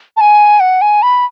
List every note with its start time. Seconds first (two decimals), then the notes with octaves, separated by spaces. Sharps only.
0.17 A5
0.21 G#5
0.60 F#5
0.81 G#5
1.02 B5